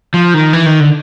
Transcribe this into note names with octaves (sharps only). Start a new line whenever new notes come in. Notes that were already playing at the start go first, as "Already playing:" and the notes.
F3
D#3
E3
D#3
D3